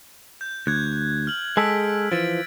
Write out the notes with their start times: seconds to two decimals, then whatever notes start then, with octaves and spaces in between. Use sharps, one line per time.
0.41 G6
0.67 D2 F#6 G#6
1.27 F6 F#7
1.57 G#3 G#4 A4 E6 B6 D7
2.12 E3 F3 A6 D7